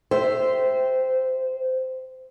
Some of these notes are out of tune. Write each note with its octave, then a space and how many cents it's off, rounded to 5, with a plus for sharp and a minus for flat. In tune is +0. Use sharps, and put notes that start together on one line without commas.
G4 +0 C5 -15 E5 +0